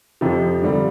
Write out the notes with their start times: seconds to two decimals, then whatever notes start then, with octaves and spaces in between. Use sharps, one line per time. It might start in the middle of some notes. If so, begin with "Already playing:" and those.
0.21 F2 C3 F3
0.62 G2 D3 G3